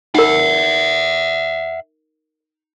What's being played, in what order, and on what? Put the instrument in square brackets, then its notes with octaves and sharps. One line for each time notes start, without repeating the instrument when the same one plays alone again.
[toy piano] D#4 A#4 [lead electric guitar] E5 F#5